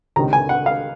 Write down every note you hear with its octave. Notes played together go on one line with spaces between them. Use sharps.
C#2 C3 D#3 A#5
G#5
F#5
F5